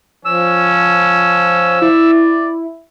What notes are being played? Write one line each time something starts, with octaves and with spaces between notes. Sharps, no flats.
F3 C#4 E6
E4 D5